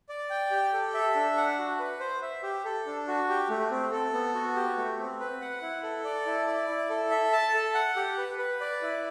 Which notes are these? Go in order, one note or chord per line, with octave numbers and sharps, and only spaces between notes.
D5
G5
G4
A4
E5
D4
F#5
F#4
B4
C5
E5
G4
A4
D4
F#4
G4
A3
C4
A4
B3
F#4
G4
A3
C4
B4
F#5
E4
A4
D5
E4
D5
E4
A4
E5
A5
A4
F#5
G4
B4
B4
D5
E4